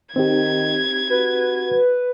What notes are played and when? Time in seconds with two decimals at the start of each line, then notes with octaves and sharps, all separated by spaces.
0.16 D#3 C4 D#4 G4 G#6
1.10 F#4 B4